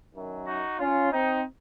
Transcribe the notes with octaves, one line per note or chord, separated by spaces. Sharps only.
F#2 D#3 F#3
D#4 F#4
C#4 F4
C4 D#4